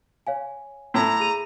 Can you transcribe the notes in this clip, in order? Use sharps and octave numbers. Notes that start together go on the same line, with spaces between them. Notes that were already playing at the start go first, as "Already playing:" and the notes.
C#5 F5 G#5
A2 A#5
G#4 D#7